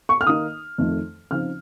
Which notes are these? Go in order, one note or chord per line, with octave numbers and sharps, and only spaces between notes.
C#6
F6
D#3 A#3 D#4 D#6
F2 D#3 A3
C#3 F3 C4 D#4 F6